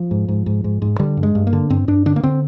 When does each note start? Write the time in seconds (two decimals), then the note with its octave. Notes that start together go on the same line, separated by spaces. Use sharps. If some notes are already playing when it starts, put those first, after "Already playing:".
Already playing: F3
0.11 G#2
0.28 G#2
0.46 G#2
0.64 G#2
0.82 G#2
0.99 D3 G3
1.17 G2
1.23 G#3
1.35 G2
1.47 A#3
1.53 D3
1.70 G2 C4
1.88 G2 D4
2.06 D3 D4
2.16 A#3
2.23 D3 C4